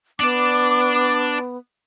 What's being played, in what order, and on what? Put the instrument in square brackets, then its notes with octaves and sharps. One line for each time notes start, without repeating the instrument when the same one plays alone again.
[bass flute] B3 [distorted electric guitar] D4 D5 [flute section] D6